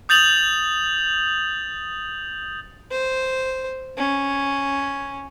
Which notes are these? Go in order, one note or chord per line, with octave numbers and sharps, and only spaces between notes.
D#6 G6 A6 F7 F#7
C5
C#4